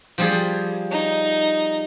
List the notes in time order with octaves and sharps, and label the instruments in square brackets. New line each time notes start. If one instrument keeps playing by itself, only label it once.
[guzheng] F3 G3 G#4
[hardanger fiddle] D#4